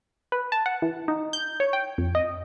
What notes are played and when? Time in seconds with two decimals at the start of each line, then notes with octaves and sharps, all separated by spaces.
0.32 B4
0.52 A5
0.66 F#5
0.82 E3
1.08 D#4
1.33 G6
1.60 C#5
1.73 G5
1.98 F2
2.15 D#5